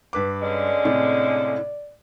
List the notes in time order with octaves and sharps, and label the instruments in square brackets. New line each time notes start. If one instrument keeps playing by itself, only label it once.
[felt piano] G2 B4 D6
[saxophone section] D3 G#3 C#4 [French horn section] D5
[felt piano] A2 C3 A3